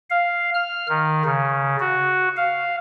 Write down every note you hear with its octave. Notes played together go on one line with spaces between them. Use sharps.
F5
F6
D#3
C#3
F#4
F5